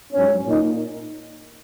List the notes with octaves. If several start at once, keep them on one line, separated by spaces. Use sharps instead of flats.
G#2 F#3 C#4
A#2 A#3 D#4